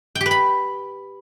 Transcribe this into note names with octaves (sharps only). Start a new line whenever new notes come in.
G5
G4
B4
B5